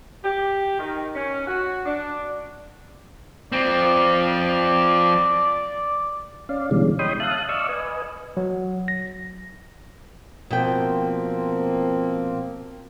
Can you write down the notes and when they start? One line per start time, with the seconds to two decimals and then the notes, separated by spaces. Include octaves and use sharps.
0.24 G4
0.79 D#3
1.15 C#4
1.48 F#4
1.86 D4
3.52 F3 C4 D5
6.49 C#4 D5 F5
6.71 B2 D3 E3 G3 G#3 C#4
6.99 C#5 D#5 G5 B5 C6 D#6
7.20 E5 F5 A5 D#6 F#6
7.49 D5 D#5 F5 C#6 E6
7.69 B4 D#5 G#5
8.37 F#3
8.88 A#6
10.50 B2 F3 A#3 C4 G5